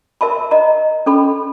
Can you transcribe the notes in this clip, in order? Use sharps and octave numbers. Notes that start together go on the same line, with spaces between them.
A#4 E5 A5 B5
D#5 A#5
C#4 A4 B5